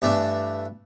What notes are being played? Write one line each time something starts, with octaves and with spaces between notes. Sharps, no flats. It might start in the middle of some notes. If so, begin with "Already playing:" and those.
G2 E3 A3 D4